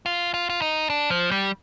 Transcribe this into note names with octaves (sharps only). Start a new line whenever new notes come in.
F4
F4
F4
D#4
D4
F3
G3